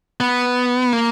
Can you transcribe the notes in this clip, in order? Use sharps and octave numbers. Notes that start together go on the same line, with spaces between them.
B3
A#3